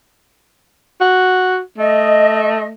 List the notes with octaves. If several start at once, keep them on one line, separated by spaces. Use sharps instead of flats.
F#4
A3 D#5